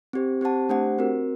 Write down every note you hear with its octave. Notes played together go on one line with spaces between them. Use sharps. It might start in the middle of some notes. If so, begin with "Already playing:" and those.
C4 G4 C5
C4 G4 C5 F#5 A5
A3 D4 G4 C5 F#5
C4 F#4 A#4